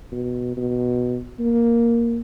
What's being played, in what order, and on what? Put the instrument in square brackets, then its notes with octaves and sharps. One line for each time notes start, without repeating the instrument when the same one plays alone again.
[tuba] B2
B2
A#3